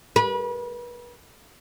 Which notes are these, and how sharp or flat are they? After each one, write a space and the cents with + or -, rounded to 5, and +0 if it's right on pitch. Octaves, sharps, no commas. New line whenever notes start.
B4 -35